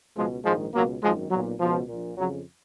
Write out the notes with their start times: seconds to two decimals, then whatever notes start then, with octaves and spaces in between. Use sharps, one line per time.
0.16 C#2 B2 F3 G#3
0.44 A#1 G#2 D#3 F3 G#3
0.73 C#2 B2 F#3 A#3
1.02 G#1 F#2 D#3 F3 G#3
1.30 B1 A#2 F#3
1.59 C#2 B2 F3
1.88 A#1 A#2
2.17 F2 C#3 F#3